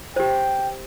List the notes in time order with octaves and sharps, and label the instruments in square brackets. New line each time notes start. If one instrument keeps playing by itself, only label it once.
[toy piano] G4 C5 [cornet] G5